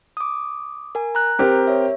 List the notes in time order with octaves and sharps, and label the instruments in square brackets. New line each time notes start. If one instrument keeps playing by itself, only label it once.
[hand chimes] D6 D#6
A#4 G#5
A#5 F#6
[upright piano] C4 G4 A#4
[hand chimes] C#5 E5